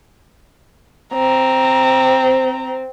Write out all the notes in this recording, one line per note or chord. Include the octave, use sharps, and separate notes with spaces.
C4 A#5